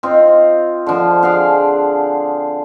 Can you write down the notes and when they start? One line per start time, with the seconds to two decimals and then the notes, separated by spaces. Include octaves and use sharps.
0.03 C4 D#4 F4
0.86 D3 F3
1.23 G#4 D5 F5 F#5